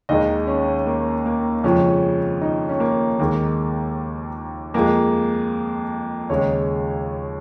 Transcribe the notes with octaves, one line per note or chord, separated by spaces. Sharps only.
D#2 D#3 G#3 D#5
C#4
A#3
A#3
F2 C#3 F3 G#3 C#4
D#4
C#4
A#3
D#2 D#3 G#3 A#3
F2 F3 G#3 A#3
D#2 C#3 G#3 C#5